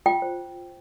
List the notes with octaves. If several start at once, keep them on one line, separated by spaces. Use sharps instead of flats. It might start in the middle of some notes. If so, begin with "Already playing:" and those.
F4 G5
C5